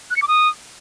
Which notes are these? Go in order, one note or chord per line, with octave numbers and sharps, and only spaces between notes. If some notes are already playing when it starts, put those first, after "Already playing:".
F#6
C#7
D6
D#6